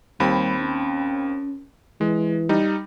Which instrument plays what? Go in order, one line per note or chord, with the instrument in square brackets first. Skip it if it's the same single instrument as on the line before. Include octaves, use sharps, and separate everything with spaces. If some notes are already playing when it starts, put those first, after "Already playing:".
[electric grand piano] D#2 C4 B5 [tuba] G3
[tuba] C#4
[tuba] E3 [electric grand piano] G#3
[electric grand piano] G3 D#4